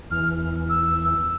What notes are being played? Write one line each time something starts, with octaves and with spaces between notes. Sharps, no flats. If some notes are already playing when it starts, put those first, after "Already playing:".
E2 E3 F6
E6